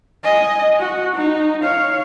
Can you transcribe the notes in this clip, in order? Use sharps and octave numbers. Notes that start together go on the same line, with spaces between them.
D#5 G#5
F#4
D#4
C#5 F5